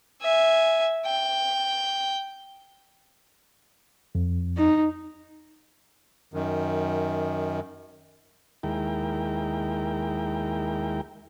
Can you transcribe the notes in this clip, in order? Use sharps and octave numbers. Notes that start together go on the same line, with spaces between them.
E5 G#5
G5
F2
D#4
F#2 D#3
D#2 G#3 E4 A#4 G5